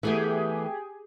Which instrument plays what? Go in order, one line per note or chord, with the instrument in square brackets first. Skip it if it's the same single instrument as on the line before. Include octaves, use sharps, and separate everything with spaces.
[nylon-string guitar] E3 A3 B3 [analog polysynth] G4 G#4